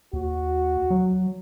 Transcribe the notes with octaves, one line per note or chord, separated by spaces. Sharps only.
D#2 F#4
F#3